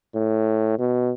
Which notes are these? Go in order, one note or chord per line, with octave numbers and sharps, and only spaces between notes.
A2
B2